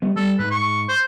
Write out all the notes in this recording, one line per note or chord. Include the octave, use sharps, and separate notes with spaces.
G3 B3
G3 A4
G#2 B4
C#6
C5